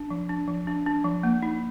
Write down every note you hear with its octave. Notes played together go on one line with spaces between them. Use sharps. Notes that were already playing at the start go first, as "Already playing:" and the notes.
Already playing: D4
F3
D4
F3
D4
D4
F3
A#3
D#4